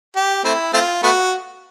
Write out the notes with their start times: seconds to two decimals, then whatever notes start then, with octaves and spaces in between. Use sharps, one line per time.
0.16 G4
0.44 A3 C4 E4
0.73 A3 C4 F4
1.03 A3 B3 F#4